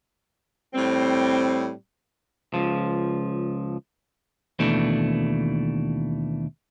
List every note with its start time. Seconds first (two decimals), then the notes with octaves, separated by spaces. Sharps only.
0.74 A2 G3 C4
2.54 C#2 F3
4.59 D#2 B2 D#3 E3 A3 D4